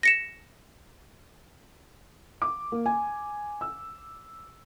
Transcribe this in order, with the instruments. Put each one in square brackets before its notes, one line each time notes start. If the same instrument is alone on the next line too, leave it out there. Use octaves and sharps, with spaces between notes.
[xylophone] A#6 C#7 E7
[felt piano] D6
A#3
G#5
E6